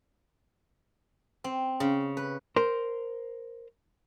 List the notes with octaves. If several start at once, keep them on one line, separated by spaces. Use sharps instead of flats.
C4
C#3
B4
A#4 C5